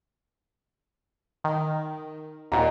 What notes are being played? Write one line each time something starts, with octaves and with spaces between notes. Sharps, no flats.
D#3
D#2 A#2 D#5 F#5 A#5